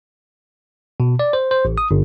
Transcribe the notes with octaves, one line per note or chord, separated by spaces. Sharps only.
B2
D5
C5
C5
A1
D#6
G1